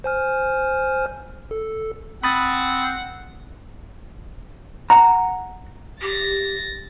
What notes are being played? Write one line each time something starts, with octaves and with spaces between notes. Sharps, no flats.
C5 G#5 F6
A4
C4 F#5 B5 D#6 A6
F#5 A#5
G4 A6 A#6